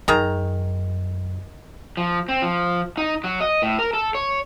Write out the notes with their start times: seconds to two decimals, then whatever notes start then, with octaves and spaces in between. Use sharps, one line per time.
0.08 F#2 D#3 G#4 A#5
1.97 F3
2.29 C4
2.42 F3
2.97 D#4
3.24 F#3
3.40 D#5
3.62 A2
3.79 A#4
3.93 A4
4.15 C#5